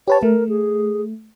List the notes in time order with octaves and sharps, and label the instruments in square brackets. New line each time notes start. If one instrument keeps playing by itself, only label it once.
[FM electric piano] G4 B4 A5 [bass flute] C#5
[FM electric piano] A3 [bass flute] A#4
[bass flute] G#4